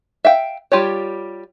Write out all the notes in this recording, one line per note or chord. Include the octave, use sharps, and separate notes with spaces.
E5 F5 G5
G3 F4 G4 C#5